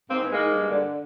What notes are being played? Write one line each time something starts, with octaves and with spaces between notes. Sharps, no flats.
G#2 A#3 C4
E3
G#3 A#3
G#2
G2
D3